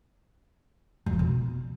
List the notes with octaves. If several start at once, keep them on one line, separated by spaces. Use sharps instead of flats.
F2
F3
B2